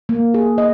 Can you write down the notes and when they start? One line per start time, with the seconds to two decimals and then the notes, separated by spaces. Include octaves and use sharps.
0.09 A#3
0.34 G#4
0.58 D#5